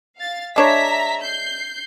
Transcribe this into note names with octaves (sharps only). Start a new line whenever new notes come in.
F5 A6
G#3 D4 C#5 E5 A#5 B6
G6 C7